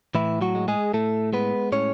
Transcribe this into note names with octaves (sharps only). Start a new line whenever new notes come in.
A2 E3 E4
F#3 F#4
G#3
G#3 G#4
A2 A3 A4
G#3 B3 B4
A2 C#4 C#5